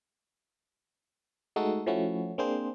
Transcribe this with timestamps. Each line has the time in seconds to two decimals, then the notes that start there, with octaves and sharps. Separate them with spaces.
1.56 G#3 A3 D#4 F#4 A4
1.86 F3 A3 C#4 E4 F#4
2.38 A#3 C4 D4 G#4 C5